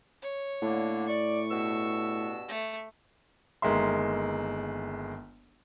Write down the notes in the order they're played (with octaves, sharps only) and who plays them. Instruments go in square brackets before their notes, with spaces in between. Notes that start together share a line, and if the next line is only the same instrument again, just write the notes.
[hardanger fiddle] C#5
[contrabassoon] A2 [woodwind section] D3 A#3
[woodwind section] D5 [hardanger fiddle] C#6
[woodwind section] G2 B2 E6
[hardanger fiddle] A3
[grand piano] G1 D#3 G#3 A#3 E5 C6